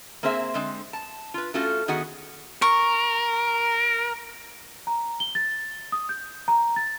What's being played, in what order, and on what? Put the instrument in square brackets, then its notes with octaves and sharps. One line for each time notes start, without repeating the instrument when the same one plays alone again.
[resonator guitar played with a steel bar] A#3 C4 G#4 C5 E5
D3 G#3 C4
A5
F4 B4
A3 C#4 F4 F#4 A4
D#3 B3 F#4 G#4 F#5
[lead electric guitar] A#4 [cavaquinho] C#6
[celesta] A#5
G7
A6
D#6
G6
A#5
A6